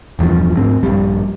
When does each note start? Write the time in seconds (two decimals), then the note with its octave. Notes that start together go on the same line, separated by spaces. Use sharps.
0.19 E1 E2 G2 F3
0.57 D2 G#2 C4
0.83 A#1 G2 G3